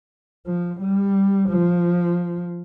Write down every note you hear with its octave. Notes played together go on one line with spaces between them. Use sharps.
F3
G3
F3